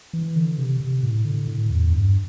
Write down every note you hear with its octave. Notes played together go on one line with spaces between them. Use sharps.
E3
D3
C3
C3
A2
D3
A2
E2
G2